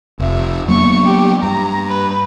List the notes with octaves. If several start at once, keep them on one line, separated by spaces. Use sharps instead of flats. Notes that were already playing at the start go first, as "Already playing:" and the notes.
F1 E5
F#3 A#3 B3 C#6
G4
G2 A#5
B4